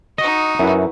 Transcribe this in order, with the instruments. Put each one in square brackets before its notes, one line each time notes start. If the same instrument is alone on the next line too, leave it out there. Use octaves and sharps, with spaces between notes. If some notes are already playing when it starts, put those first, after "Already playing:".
[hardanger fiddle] D#4 F#4 [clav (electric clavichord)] D#5
[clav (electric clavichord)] F#2 [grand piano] E4 B4